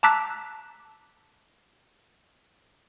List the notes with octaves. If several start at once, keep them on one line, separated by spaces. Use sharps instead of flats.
A5 A#5 D6 E6 F#6 B6